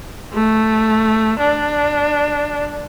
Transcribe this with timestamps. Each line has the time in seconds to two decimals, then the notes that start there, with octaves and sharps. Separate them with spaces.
0.33 A3
1.40 D4